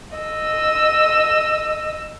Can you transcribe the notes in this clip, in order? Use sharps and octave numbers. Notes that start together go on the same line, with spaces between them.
D#5 E6